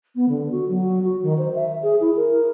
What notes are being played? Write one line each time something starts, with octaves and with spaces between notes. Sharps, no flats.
B3
D3
F#4
F#3
F#4
D#3
C5
E5
G#4
E4
A#4